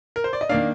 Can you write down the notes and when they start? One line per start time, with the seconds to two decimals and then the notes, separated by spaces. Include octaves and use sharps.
0.16 A#4
0.24 C5
0.33 D5
0.41 D#5
0.49 D#3 A#3 D4 D5 F5